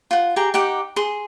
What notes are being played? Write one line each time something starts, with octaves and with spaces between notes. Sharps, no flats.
F4 F#5
G4 G#4 A#5
D#4 G4 F#5 D6
G#4 C6 D#6